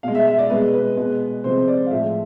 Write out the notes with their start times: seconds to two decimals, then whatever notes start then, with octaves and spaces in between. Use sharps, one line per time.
0.03 B2 G#3 F5
0.15 E5
0.27 E5
0.38 D5
0.50 B2 G#3 B4
0.74 B4
0.97 B2 G#3
1.44 C3 F3 G#3 C5
1.68 D5
1.86 F5
1.91 A2 F3 G#3 E5